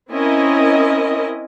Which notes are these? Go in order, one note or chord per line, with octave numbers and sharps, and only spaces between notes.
C4 C#4 E4 A#4 D#5